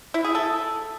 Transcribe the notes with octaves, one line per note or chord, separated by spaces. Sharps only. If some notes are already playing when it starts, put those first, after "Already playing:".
E4
G#4
A4